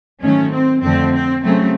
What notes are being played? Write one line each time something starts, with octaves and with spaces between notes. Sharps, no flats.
G#2 D#3 F#3 A3 C#4
C4
F2 D3 F3 A3 C4
C4
C#3 F#3 A3 C4